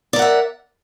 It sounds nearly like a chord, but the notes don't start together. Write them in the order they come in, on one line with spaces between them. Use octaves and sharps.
D5 A#4 F#5 E5